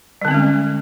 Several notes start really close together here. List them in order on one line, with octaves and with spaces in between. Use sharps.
G3 D3 C4 C#4 G#3